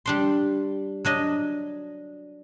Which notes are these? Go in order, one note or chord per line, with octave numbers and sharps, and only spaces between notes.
G3 D4 C6
F#3 D4 D#5